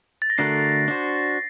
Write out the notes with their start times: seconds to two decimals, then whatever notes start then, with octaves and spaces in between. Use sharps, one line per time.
0.22 A6
0.30 A#6
0.38 D3 A3 D4 F#4 A#4 C7
0.88 D4 F#4 C5